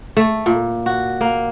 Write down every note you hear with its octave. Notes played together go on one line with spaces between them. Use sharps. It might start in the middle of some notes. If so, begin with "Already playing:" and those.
A3
A#2
F#4
A#3